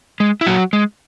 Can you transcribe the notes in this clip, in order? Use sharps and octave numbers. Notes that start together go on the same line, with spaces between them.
G#3
E4
A#2 F#3 F#4
G#3